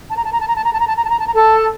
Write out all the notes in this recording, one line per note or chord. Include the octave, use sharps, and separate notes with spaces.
A5
A#5
A5
A#5
A5
A#5
A5
A#5
A5
A#5
A5
A#5
A5
A#5
A5
A#5
A4 A5